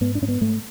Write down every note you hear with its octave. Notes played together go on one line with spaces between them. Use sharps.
G#2 B3
D4
G#2 C#4
B3
G#2 A3